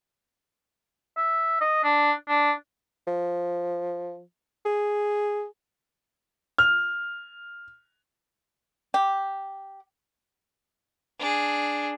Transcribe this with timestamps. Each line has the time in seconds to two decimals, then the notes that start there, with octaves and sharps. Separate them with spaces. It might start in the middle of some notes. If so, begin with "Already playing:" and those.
1.17 E5
1.61 D#5
1.84 D4
2.29 D4
3.07 F3
4.65 G#4
6.58 F6
8.94 G4
11.19 D4 G#4